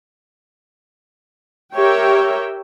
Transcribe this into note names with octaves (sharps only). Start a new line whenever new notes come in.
G4 A#4 C#5 E5 G5